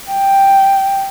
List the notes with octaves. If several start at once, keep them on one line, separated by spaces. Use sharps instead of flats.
G5